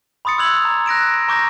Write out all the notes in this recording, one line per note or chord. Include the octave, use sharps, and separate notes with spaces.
B5 C6 D#6 A6 C#7
D6 E6 F#6 G#6 F7 F#7
A#5
F#6 A#6 D7 E7
A#5 C#6 D6 G6 A#6